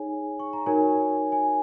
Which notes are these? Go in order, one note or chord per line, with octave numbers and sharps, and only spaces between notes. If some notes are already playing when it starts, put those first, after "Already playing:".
Already playing: D#4 G#4 C#5 G#5
C#6
A#5
D#4 F#4 A#4 C#5 G#5
G#5